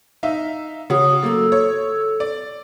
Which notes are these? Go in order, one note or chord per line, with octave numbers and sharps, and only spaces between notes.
D#4 E5 F5
C#3 F#4 C#5 D#6
F#3 A#3 A4 E6
C#5
D5